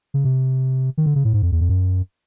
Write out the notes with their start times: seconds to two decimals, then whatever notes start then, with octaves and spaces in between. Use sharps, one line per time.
0.14 C#3
0.25 C3
0.98 D#3
1.06 D3
1.15 C#3
1.25 A2
1.34 G#2
1.42 F2
1.52 E2
1.61 F2
1.69 F#2